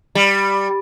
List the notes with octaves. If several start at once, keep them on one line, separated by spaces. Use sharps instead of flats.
G3